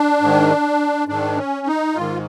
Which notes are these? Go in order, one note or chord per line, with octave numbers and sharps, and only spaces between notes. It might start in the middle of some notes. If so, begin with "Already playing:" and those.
Already playing: D4
G#2 D#3
G#2 D#3 D4
C#4
D#4
G#2 F4
D#3